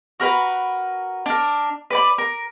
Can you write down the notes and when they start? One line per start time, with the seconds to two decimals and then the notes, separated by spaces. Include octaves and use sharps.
0.20 F#4 A#4 B4 B5
1.26 D4 A#4
1.90 B4 D5 B5
2.18 A#4